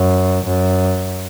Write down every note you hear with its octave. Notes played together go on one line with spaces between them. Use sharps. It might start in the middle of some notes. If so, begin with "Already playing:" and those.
Already playing: F#2
F#2